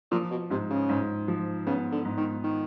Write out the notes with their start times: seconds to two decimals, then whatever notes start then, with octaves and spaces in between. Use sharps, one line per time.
0.11 A#2 F3
0.31 B2
0.50 G#2 C3
0.70 C#3
0.89 G#2
1.28 F3
1.67 C#3 B3
1.92 D3
2.05 G#2
2.17 D#3
2.44 D#3